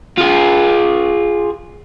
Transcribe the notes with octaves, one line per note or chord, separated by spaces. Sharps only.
F4 G#4